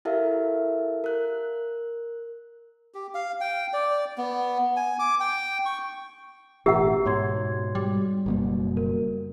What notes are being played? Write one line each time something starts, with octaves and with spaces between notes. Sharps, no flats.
E4 G4 A4 A#4 E5 F5
A#4 F#6
G4
F5
G5
D5
B3
G#5
D6
G5
C#6
A1 B2 G4 E5 F#5 A#5 E6
G#2 B2 C#5 C6 G#6
G3
F#1 B2 A#3
A#4